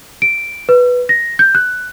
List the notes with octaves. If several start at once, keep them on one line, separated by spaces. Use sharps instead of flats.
D7
B4
A#6
G6
F#6